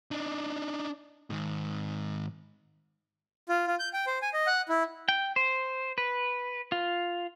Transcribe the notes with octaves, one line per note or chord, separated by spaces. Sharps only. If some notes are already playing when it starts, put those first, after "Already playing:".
D4 D#4
G#2 D#3
F4
F4
G6
G5
C5
G#5
D#5
F#5
E4
G5
C5
B4
F4